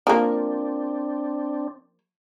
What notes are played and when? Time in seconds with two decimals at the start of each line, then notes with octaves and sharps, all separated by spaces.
0.07 F3 A#3 C4 D4